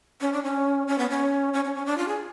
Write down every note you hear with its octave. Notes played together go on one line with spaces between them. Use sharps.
C#4
D4
C#4
C#4
B3
C#4
C#4
C#4
C#4
D4
F4
G#4